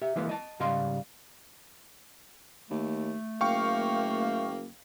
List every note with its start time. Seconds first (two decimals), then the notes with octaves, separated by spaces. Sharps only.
0.02 G4 E5
0.16 E3 G#3 A#3 E4 B4
0.29 D#5 A5
0.60 G#2 C#3 G3 D#5 F5 C6
2.70 D#2 A3
3.41 F#1 A#3 F5 G5 C#6